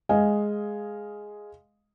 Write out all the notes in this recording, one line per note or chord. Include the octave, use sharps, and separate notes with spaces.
G#3 D#5 F5 G#5